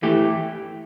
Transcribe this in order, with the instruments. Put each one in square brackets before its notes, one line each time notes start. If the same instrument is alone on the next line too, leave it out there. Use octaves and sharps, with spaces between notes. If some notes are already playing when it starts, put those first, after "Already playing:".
[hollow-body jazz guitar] E3 A3 G4